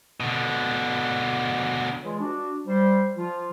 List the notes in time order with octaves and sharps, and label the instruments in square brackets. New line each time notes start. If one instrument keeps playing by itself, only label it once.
[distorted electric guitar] B2 D3
[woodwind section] E3 G#3 F4 G#4 C#5
D4 F#4
G3 C5
F3 F4